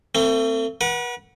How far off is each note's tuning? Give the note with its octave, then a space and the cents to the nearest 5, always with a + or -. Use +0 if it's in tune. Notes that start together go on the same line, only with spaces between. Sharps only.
A3 +35 C4 -10
B4 -40 F#5 +0